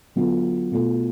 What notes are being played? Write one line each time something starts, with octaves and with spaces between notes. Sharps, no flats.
D3 F#3 B3 F4
B2 A3 F4